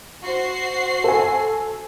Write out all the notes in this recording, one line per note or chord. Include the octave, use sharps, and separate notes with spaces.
F#4 C5 C7
A4 G#5